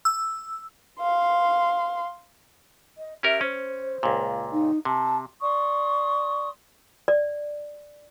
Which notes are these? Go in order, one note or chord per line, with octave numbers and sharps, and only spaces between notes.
E6
F5 C6
D#5
C#4 G4 A#4 E5
C#4 C5
C#2 A#2
D#4
C3 A5
D5 C6 C#6 D#6
D5